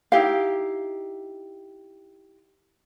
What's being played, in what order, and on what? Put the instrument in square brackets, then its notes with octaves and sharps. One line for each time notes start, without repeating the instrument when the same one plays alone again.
[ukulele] D#4 E4 G4 F5